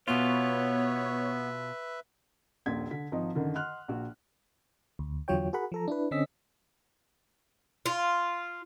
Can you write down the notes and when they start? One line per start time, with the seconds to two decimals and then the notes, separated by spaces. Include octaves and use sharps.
0.08 B2 B3 F4 B4 C#5 E5
2.66 D#1 A#1 G#6 B6
2.91 D3 B6
3.12 G#1 F3 D#4 D#5
3.35 F#2 D3 D#3
3.54 D#5 F#5 C6 F6 F#6
3.88 A#1 F#4
4.99 D2
5.28 E2 D3 F#3 F4 C#5 G5
5.53 F#4 G#4 A#4 F#5 B5
5.72 F3 A4 A#5
5.88 D4 E4 B4
6.11 D3 C4 C#4 D#5 E6 B6
7.86 F4